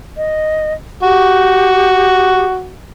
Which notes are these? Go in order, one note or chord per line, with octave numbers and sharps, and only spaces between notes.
D#5
F#4 G4